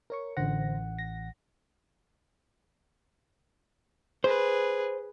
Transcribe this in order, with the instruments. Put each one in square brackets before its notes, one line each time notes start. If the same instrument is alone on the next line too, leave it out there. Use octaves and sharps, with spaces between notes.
[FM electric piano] A#4 C#5 C#6
[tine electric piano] A1 F#5 [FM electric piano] D3 C5 A#6
[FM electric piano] A#6
[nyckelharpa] G#4 B4 [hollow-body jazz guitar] C5